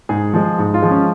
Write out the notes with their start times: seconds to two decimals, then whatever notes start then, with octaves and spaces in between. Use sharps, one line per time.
0.09 G#2 G#4
0.33 F3 G#3
0.59 G#2
0.74 F4
0.82 F3 G#3
0.91 C#4